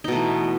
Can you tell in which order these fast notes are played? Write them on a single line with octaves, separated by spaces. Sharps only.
D#4 B2 A3 E3